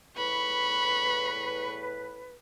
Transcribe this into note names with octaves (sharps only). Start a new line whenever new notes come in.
E2 A2 B4 B5 C#6